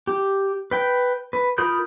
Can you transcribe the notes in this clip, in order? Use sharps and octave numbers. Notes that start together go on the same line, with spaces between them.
G4
B4 G5
B4
F4 A#4 B5 D#6 G6